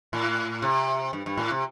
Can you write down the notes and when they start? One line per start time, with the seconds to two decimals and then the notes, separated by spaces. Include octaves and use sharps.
0.13 A2
0.62 C3
1.13 G2
1.26 G2
1.37 A2
1.51 C3